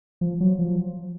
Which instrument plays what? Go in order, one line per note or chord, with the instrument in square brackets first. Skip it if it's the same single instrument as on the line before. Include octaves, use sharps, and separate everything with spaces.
[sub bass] F3
F#3
F3